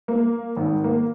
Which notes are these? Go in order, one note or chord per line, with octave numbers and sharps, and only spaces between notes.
A#3
G#1
A#3